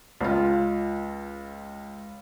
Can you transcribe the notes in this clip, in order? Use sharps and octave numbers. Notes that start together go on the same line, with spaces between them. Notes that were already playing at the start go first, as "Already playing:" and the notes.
C#2 F4